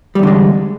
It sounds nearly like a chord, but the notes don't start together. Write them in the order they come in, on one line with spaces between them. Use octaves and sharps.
G3 E2 D3 G#3